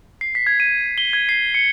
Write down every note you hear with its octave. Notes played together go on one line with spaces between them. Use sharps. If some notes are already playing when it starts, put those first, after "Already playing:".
C7
B6
G#6
D#7
G7
G#6
C7
C#7